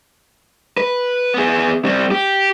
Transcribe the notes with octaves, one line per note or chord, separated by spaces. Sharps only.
B4
B3 G#4
G3 C4
G4